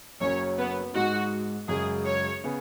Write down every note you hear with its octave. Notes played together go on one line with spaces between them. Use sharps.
F#1 F#2 F#3 C#4 C#5
B3
G#2 G#3 D#4 F#4
F#2 C#3 G#3 G#4
C#5
C#3 B3 G#4